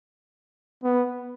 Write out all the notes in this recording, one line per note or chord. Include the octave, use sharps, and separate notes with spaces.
B3